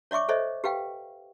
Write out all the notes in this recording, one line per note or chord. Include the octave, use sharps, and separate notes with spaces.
C#5 D5 E5 C#6 D6
A4 C5 C#5 D#5 E5
G4 B4 F5 G5